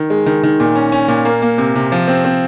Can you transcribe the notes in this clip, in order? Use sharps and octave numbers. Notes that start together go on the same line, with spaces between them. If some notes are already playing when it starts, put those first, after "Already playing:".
Already playing: D#3
G#3
D#3
D#3
A#2
C#4
C#4
A#2
A#3
A#3
C3
C3
F3
C4
C4